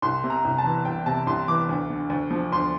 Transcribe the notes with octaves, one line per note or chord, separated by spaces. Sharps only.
C2 C6
C3
A#5
C2
A5
E3
C2 G5
C3 A5
C2 C6
E3 D6
D2
D3
D2
F3
D2 C6